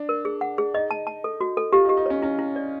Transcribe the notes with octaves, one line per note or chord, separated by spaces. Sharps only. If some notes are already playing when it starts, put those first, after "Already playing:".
Already playing: D4
A#4
G#4
F#5
G#4
D#4 D#5
A5
A5
A4
F#4
A4
F4 G4
D#4
G4
D#4
C#4 C#5
C#4 E4
E4
D5